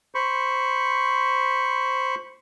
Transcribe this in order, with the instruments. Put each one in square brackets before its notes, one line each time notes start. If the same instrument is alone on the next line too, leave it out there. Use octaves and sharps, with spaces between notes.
[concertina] C5 B5 C#6